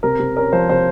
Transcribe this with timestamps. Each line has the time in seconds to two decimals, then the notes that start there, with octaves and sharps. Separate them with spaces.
0.03 C3 A#4
0.19 C3
0.36 C#4 A#4
0.53 F3 C5
0.69 C3 C5